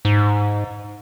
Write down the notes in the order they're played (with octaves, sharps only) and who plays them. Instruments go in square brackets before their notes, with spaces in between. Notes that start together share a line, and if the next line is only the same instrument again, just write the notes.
[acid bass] G#2